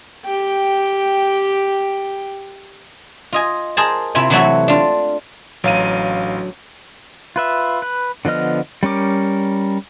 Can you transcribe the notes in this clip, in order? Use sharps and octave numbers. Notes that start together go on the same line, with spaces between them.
G4 G5
F4 D#5 G#5
G#4 A#4 C5 G#5 A5
C3 E4 F4 G#5
C3 E3 F#3 A3 E4 F#4
D4 F4
A1 D3 F#3 F5 D#7
F4 B4 E5
B4
D3 F3 B3 D#5 F6
G3 C#4 A#4 D6